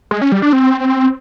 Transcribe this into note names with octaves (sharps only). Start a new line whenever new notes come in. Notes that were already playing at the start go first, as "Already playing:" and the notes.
G#3
C#4
G3
D4
C4